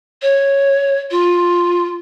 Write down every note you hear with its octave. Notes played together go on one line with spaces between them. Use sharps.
C#5
F4